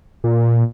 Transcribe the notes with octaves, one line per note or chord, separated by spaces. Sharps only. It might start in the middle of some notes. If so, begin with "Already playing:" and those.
A#2